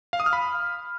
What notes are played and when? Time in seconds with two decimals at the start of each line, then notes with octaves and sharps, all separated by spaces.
0.13 F5
0.20 D#6
0.26 F6
0.33 B5